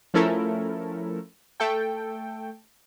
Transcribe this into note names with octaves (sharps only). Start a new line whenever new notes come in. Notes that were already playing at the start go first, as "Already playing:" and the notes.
F3 A3 C#4 E4 A4 A#4
A3 A4 G5